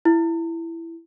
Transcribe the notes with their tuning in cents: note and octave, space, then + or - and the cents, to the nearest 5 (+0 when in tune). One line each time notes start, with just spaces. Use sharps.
E4 +10